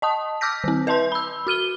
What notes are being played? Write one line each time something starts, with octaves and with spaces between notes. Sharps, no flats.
D#5 A5 D#6
D6 E6 F6 G6 A#6 B6
D#3 C4
B4 E5 A5 C6 G6
B5 E6
F#4 F6 D#7 G7